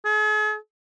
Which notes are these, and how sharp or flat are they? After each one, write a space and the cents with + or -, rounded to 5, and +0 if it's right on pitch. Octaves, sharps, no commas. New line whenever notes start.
G#4 +45